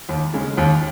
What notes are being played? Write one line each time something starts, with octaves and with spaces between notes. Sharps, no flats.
D#2
C#3 G#3
D#2